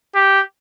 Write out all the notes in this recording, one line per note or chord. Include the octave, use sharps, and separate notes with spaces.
G4